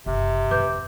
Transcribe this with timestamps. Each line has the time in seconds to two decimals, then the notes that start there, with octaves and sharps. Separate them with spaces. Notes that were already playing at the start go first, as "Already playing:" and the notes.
0.06 F#1 C3
0.51 G#1 F2 B4 D6 G6